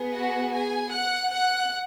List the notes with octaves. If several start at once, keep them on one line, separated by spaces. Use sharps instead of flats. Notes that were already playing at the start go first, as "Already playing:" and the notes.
Already playing: B3 G#4
F#4 F#5
G#4 G#5
F#5 F#6
F#5 F#6